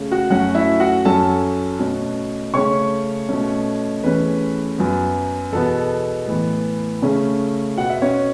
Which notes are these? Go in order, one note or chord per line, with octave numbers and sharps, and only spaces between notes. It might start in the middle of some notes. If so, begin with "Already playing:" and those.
Already playing: C#3 A3 C#4
F#4 F#5
F#2 F#3 A3 C#4 F#4 F#5
E4 E5
F#4 F#5
F#2 F#3 C#4 A4 A5
B2 A3 C#4
C#3 A3 C#4 C#5 C#6
B2 A3 C#4
E2 E3 A3 C#4 B4
F#2 F#3 B3
E2 B2 B3 A4
A2 E3 B3
C#3 A3 C#4
B2 B3 F#5
E5
C#4 C#5